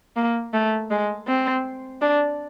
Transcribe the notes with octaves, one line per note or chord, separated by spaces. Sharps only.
A#3
A3
G#3
C4
D4